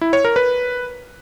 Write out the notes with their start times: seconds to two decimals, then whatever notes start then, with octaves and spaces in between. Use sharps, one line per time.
0.01 E4
0.13 C#5
0.24 A#4
0.36 B4